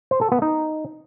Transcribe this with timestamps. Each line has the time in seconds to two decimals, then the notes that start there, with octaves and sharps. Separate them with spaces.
0.11 C5
0.21 A4
0.32 B3
0.42 D#4